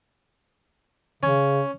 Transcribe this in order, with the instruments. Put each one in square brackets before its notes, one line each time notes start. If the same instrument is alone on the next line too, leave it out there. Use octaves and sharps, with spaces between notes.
[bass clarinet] C#3 [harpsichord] C#4